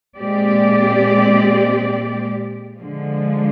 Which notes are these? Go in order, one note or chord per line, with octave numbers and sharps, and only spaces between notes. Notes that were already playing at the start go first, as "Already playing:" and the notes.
A#2 G#3 C4 G4 D5
D3 F3 G#3